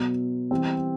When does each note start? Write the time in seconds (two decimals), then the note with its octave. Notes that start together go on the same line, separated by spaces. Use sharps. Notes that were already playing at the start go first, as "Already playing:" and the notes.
Already playing: B2 F#3 B3
0.51 E3 G3 C4